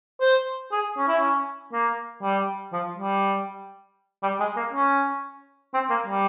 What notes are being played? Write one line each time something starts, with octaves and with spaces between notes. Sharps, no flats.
C5
G#4
C#4
E4
C#4
A#3
G3
F3
G3
G3
G#3
A#3
C#4
C4
A#3
G3